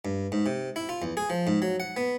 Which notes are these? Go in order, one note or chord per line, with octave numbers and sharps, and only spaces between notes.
G2
G#2
C3
E4
F4
E2
G#4
F3
G#2
F#3
F#5
B3